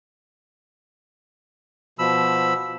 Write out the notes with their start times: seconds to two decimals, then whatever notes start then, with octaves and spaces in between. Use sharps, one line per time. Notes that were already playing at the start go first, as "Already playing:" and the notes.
1.99 B2 F3 B5 E6